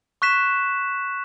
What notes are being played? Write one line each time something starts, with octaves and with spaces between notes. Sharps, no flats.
C#6 F#6 B6 E7